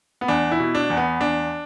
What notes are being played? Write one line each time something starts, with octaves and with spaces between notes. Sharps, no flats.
B3
E2 D4
E4
B2
D4
E2
B3
E2 D4